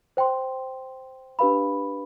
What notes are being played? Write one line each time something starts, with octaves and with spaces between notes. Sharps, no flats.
C5 G5 C6
D4 G4 B4 F5 B5